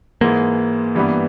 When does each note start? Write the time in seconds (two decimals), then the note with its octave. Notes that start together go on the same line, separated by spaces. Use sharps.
0.21 G#2 E3 G#3 A#3
0.95 G2 E3 G3 B3